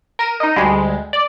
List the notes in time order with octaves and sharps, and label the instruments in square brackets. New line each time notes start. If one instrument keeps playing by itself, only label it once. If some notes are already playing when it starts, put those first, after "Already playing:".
[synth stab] A#4 D#7 E7
D#4 D#5
D2 G3 G#3
D5